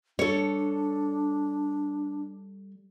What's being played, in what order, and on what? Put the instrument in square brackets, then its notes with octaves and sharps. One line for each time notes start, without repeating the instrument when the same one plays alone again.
[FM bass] G3 [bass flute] D4 [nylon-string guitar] A4 C#5